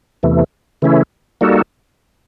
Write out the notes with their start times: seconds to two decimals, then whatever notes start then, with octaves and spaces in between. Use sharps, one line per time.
0.23 E2 C3 E3 A3
0.82 C#3 E3 A3 C#4 E4
1.41 G3 A#3 D#4 F#4 A4